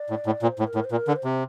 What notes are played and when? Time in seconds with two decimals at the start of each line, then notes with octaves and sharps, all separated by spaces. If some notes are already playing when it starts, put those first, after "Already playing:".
Already playing: D5
0.10 A2
0.26 A2
0.42 A#2 C5
0.59 A2
0.67 A#4
0.75 A2
0.84 C5
0.91 A#2 A#4
1.08 D3
1.16 C5
1.24 C3